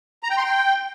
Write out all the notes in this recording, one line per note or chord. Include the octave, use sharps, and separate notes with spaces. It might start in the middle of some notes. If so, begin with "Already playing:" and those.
A#5
G5
C6
G5